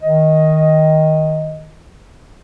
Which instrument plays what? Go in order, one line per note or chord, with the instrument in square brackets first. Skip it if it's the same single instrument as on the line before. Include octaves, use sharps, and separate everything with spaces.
[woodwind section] D#3 D#5